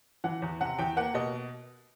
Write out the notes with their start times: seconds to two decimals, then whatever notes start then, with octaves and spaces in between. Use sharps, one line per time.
0.24 E3 F#5
0.42 E2
0.61 C3 F#5
0.79 E2 G5
0.97 A#3 F#5
1.14 B2 D#5